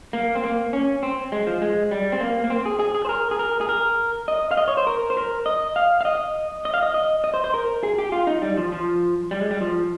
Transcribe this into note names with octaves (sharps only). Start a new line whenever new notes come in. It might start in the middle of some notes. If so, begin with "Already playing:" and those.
A#3
C4
A#3
C#4
C4
G#3
F3
G#3
G3
C4
A#3
A#3
C4
G#4
G#4
G#4
C5
A#4
G#4
A#4
G#4
A#4
D#5
F5
D#5
C#5
C5
A#4
C5
A#4
D#5
F5
F5
D#5
D#5
F5
D#5
D#5
D#5
C5
C5
A#4
G#4
G4
F4
D#4
G3
F3
F3
G3
G#3
G3
F3